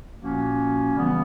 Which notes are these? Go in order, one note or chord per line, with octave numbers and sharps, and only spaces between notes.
A#2 F3 A#3 C#4 F#4
C#3 E3 G3 B3